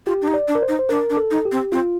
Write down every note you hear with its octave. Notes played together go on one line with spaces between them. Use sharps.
F4 G4
D4
D#4
D5
D4
A#4
C5
D#4
C5
D4 A#4
D4
A4
D#4
G4
C4
C4 F4